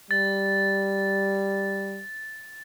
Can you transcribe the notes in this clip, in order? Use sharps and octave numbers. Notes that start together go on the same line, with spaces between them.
G3 A6